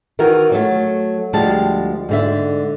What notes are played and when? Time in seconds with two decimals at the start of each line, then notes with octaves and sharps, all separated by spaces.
0.19 D#3 E3 F#4 A#4
0.52 F#3 A3
1.33 D2 F3 G3 G#3 A5
2.09 G#2 D3 E5